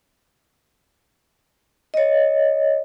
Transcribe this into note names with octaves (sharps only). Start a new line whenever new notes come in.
C#5 D#5